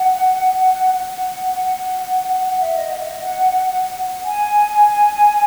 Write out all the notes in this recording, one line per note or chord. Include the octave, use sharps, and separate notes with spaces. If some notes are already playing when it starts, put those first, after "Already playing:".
Already playing: F#5
F#5
F#5
F#5
E5
D#5
F#5
G#5